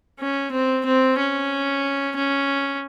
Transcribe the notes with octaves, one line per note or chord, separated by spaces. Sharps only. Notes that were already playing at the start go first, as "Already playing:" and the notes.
C#4
C4
C4
C#4
C#4